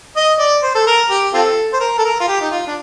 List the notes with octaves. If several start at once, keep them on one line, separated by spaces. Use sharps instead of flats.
D#5
D5
C5
A4
A#4
G4
C4 F4 A4
C5
A#4
A4
A#4
F4
G4
D#4
F4
D4